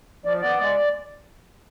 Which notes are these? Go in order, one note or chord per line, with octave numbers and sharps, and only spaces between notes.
F3 D5
B3 D5
G#3